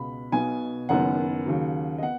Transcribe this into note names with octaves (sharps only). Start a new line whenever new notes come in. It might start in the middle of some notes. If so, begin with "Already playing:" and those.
Already playing: C#2 B2 B3 B5
B1 B2 B3 G#5
F#1 F#2 D#3 B3 F#5
D#2 C#3 F#3
D#5
B3 F#5